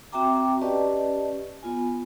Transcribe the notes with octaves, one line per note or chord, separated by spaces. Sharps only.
C4 F#4 E5 G5 A#5 D6
C#4 G4 B4 D5 D#5 A5
B3 F4 G#5